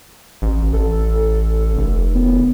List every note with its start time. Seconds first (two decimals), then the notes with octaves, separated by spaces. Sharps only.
0.42 A1
0.73 A1 A4
1.76 F1
2.15 B3